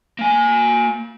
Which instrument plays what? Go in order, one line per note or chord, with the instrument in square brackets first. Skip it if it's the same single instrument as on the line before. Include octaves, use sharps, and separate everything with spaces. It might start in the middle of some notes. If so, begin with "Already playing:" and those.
[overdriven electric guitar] A#3 G#5